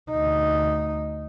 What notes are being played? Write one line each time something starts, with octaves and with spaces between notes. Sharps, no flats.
D2 D#4